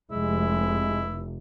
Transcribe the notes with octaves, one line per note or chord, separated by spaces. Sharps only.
F1 G#3 E4